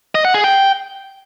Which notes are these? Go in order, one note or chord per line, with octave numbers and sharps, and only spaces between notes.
D#5
F#5
G#4
G5